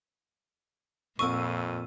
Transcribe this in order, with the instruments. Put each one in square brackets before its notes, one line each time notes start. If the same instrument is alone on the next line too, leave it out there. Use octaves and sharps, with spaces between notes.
[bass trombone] F2 [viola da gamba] A#2 [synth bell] C4 E6 D#7 [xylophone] C#6